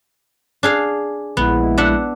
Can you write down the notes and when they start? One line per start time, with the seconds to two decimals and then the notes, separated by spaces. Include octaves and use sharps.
0.63 D4 G#4 F5
1.37 A#1 G#3 B3 E4
1.78 D4 E5 F#5